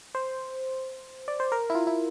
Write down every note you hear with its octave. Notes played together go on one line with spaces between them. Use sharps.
C5
D5
C5
A#4
E4
F4
E4